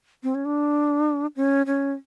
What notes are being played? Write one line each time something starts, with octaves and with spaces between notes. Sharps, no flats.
C4
C#4
D4
C#4
C#4